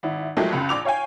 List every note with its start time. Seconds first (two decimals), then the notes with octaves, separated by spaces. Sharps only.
0.03 G#1 E4
0.37 F3 F#3 G#3 A3 G4 A#4
0.52 C#2 F#2
0.69 A#1 D6 F7
0.85 C#5 F5 G5 G#5